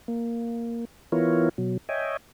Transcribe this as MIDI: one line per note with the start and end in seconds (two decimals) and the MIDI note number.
0.08 0.85 58
1.12 1.49 52
1.12 1.49 59
1.12 1.49 64
1.12 1.49 65
1.12 1.49 70
1.12 1.49 73
1.58 1.77 47
1.58 1.77 54
1.89 2.17 73
1.89 2.17 75
1.89 2.17 76
1.89 2.17 79
1.89 2.17 80